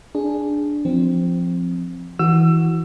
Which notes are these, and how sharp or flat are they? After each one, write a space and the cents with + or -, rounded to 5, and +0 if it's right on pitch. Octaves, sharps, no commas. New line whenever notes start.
D4 +0 G#4 +0
F3 +0 C4 +0
E3 -15 F#4 +0 E6 +25